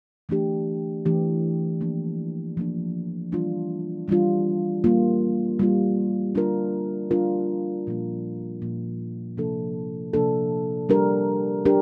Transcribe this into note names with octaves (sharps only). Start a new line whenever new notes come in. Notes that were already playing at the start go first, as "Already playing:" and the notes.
E3 A3 D4 G4
E3 A3 D4 G4
F3 A#3 D4
F3 A#3 D4
E3 G3 D4 F4
E3 G3 D4 F4
G3 A#3 F4
G3 A#3 F4
G3 D4 F4 A#4
G3 D4 F4 A#4
A#2 F3 A#3
A#2 F3 A#3
C3 F3 A#3 D4 A4
C3 F3 A#3 D4 A4
G3 D4 G4 A#4
G3 D4 G4 A#4